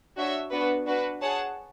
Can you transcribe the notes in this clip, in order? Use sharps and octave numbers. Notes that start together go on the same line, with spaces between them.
D4 F#4 C#5 E5
B3 D4 F#4 B4
D4 F#4 B4
G#4 C#5 F#5 A5